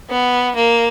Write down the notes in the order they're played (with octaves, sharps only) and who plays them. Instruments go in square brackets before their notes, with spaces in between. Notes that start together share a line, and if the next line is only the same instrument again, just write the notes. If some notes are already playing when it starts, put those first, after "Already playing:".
[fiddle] B3
A#3